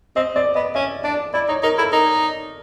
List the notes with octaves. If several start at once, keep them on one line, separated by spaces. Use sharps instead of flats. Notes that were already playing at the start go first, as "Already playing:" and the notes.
C4 D#5
C4 D5
B3 D#5
C#4 E5
D4 D5
E4 D5
D#4 C#5
D#4 A#4
E4 A4
D#4 A#4